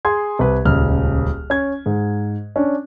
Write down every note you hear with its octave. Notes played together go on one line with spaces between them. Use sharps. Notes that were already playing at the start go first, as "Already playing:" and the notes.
G#4 C6 G#6
C2 B4
D#1 C#2 F6
C#4 G#6
G#2
C#4 D4